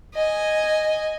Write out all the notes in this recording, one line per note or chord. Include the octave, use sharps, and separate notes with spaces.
D#5 G#5